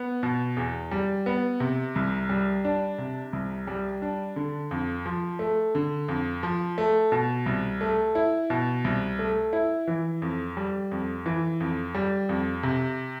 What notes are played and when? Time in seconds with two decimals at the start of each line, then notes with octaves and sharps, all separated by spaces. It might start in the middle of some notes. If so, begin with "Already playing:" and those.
Already playing: B3
0.23 B2
0.57 E2
0.91 G3
1.26 B3
1.60 C3
1.96 C2
2.29 G3
2.65 D4
2.98 C3
3.33 C2
3.67 G3
4.02 D4
4.36 D3
4.71 F2
5.06 F3
5.39 A3
5.75 D3
6.08 F2
6.43 F3
6.78 A3
7.12 B2
7.46 C2
7.81 A3
8.15 E4
8.50 B2
8.84 C2
9.19 A3
9.53 E4
9.87 E3
10.22 F2
10.57 G3
10.91 F2
11.26 E3
11.60 F2
11.95 G3
12.29 F2
12.63 C3